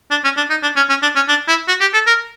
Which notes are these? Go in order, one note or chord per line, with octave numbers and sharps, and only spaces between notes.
D4
C#4
D4
D#4
D4
C#4
C#4
D4
C#4
D4
E4
F#4
G4
A4
A#4